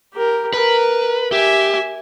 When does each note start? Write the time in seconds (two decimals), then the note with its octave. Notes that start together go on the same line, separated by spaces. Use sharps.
0.14 G4 A#4
0.54 A#4 B4
1.32 G4 E5 G#5